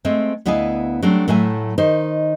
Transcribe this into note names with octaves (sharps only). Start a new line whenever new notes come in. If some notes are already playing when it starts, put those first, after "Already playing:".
G#3 A3 C4 C5
D2 B3 E4 D#5 F5 G#5
F#3 G3 A3 C4 D4
A2 F#3 A3 E5 G#5
D#3 D#4 C5